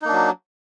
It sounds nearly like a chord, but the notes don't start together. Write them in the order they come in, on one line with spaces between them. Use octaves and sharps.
D#4 A#3 D4 F#3